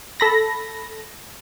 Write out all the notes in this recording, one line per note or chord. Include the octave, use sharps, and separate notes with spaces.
A4 B5 A#6